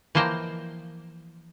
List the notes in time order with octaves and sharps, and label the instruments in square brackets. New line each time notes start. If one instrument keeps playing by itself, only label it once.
[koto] E3 F3 A#3 C5 D#5 G5